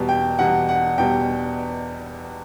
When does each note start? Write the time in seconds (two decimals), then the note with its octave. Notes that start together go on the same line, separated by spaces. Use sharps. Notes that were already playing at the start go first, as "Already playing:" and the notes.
Already playing: E2 B2 G3
0.09 G5
0.39 E2 B2 G3 F#5
0.69 F#5
0.98 E2 B2 G3 G5